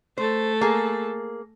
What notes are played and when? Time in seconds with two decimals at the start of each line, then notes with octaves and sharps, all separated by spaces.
0.18 A3 A4 C5
0.61 A#3 G#4